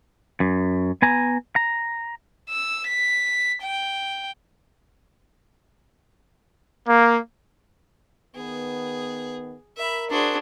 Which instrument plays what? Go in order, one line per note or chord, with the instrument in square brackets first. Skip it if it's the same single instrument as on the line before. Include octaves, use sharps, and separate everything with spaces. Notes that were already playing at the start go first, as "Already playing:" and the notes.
[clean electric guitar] F#2
B3 G#5 A#5
A#5
[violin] E6
B6
G5
[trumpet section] A#3
[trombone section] D#3 B3 [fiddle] G#4
[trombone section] A#4 [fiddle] E5 B5
[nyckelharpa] D4 G#4 [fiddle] F#4 C5